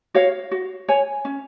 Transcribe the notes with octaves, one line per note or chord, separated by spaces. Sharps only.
F#4 C#5 F5
F#4
C#5 G#5
C#4